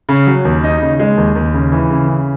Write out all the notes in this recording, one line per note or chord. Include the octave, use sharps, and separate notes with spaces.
C#3
F#3
D#2
D#4
C#3
G#3
D#2
D#2
C#3
E3
C#3
C#3